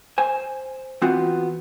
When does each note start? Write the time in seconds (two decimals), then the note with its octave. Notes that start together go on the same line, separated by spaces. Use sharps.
0.18 C5 G#5
1.02 E3 B3 C4 F4 F#4